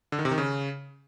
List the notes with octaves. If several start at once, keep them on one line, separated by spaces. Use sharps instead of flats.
D3
D#3
C3
D#3
C#3